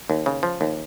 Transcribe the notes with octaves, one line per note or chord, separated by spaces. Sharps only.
D#2
C#3
F3
D#2